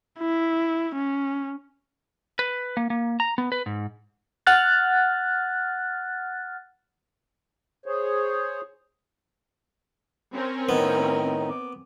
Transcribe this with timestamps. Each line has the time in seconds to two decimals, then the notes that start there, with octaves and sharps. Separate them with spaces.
0.19 E4
0.95 C#4
2.39 B4
2.77 A#3
2.90 A#3
3.20 A#5
3.38 B3
3.52 B4
3.66 G#2
4.47 F#5 F6 F#6 A6
7.86 G#4 C5 C#5
10.33 C4 C#4 A#4
10.69 A2 D#3 B3 D#4
11.50 D6